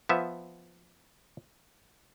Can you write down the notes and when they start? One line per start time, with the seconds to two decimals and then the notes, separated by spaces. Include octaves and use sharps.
0.09 F3 B3 E5